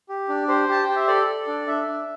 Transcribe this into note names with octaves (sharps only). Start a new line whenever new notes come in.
G4
D4
G4 C5
G4 A5
G5
G4
E5
A4 D5
A4
D4
D4 E5
D4